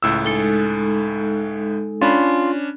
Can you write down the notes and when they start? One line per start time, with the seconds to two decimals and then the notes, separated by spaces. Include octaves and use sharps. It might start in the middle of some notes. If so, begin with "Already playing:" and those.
0.03 C#2 A2 E6
0.25 G#3 D#4 A4
2.01 C#4 D4 F4 B5